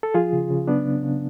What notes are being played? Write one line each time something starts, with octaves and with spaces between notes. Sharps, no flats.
A4
F3 F4 G#4
C#3
C#3
F#3 B3 D4
C#3
C#3